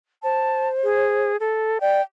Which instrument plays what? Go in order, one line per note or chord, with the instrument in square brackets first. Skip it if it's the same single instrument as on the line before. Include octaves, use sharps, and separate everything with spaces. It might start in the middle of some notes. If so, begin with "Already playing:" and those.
[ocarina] C5 [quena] A5
[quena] G#4
A4
[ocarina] D5 [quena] G5